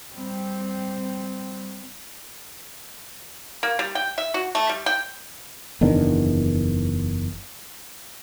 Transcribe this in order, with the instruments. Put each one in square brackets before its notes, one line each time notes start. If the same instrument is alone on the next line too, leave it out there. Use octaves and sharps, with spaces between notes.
[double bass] G3 C4
[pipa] A#3
G3
G5
E5
F#4
A3
G3
G5
[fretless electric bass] F#1 E2 D#3 D4